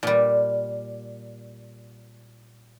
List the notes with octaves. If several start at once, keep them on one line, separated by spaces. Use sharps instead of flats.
A#2 G3